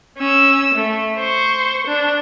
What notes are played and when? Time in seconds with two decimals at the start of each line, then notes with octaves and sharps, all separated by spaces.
0.18 C#4 E6
0.74 A3
1.19 C5 C#6
1.87 D4